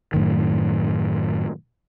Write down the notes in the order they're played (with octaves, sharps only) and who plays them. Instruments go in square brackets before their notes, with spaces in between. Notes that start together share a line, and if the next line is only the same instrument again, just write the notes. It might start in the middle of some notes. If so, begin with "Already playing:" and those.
[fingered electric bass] F#2 A2 D#3